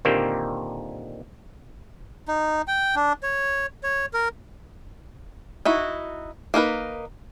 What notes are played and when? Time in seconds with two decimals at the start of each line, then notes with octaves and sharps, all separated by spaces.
0.05 A#2 D3 D#3 A#3 C4 G4
2.28 D#4
2.68 G5
2.96 D4
3.23 C#5
3.83 C#5
4.14 A#4
5.65 D#4 E4 F#4
6.54 A#3 D#4 A#4 B4